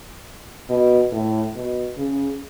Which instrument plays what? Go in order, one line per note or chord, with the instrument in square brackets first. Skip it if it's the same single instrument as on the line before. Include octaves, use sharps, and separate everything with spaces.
[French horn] B2
A2
B2
C#3